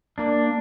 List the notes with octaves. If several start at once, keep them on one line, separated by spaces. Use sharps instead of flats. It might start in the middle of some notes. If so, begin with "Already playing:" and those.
A#3 D4